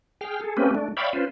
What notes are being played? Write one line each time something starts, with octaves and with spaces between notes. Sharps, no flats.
G#4 G5 F6
G#4 A4
A3 A#3 C4 C#4 G4 B4
A3 D4
C#5 D5 E5 F5 G5 B5
C#4 F4 B4 C5